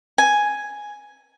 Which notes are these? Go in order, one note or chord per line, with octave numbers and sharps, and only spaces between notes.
G#5